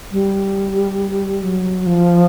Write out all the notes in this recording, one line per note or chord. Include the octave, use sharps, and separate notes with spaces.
G3
F#3
F3